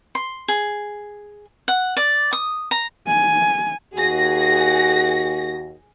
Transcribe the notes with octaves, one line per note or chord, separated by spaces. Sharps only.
C6
G#4
F#5
D5
D#6
A#5
G#5
D#2 F#4 G#4 A#6